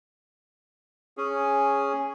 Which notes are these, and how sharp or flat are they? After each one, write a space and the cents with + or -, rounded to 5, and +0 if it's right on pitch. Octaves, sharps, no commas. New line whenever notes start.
C#4 +0 G#4 +0